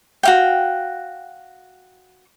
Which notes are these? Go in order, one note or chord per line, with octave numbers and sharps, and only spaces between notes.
F#4 F5 G5